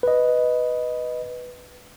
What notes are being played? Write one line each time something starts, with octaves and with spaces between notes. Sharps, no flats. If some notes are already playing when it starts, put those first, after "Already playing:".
B4 D#5